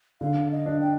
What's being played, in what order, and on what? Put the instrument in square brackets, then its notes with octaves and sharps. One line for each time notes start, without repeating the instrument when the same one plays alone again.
[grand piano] D3 [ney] F5
[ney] D#5
[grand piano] D4
[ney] G5